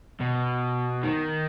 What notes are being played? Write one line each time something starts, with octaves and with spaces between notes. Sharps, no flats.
B2
D#3